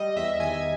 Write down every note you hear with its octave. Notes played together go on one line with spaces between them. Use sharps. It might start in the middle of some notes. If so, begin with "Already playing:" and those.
Already playing: G3 D#5
E2 E5
D#3 G#5